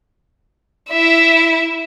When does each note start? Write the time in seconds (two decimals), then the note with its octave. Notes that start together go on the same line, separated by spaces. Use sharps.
0.90 E4 E5